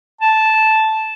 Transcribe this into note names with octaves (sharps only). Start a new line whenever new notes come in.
A5